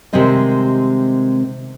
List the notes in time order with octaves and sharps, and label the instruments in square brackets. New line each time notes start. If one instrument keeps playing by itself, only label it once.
[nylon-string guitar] C3 D#3 G3 G#3 C4 D#5